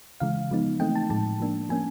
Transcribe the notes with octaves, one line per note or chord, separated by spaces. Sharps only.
C#3 E3 G#3 F5
F3 G#3 B3 D#4
E3 A3 C4 D#4 G5
A5
A2 F3 G#3 A5
F3 A#3 D4
F3 A#3 C#4 G#5